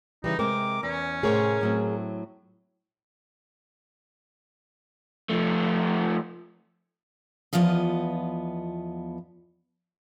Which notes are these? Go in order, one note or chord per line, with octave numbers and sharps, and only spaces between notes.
C#3 E3 G3 D#4
C3 G#3 C4 A#4 D6
E2 C#4
A2 C3 G#4 A#4 C5 C#5
A2 F#3 C4
F3 A3
E2 F3 B3 F4 D#5